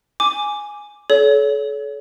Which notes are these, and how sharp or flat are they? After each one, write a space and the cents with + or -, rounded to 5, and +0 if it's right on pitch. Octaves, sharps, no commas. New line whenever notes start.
G#5 +0 D6 +0
A4 -35 C#5 +30